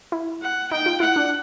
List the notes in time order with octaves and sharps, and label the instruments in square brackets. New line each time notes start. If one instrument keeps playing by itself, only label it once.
[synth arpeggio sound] E4
[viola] F#5
[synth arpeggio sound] D#4 [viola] G5
[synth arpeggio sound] F4
[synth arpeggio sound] E4 [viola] F#5
[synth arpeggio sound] D4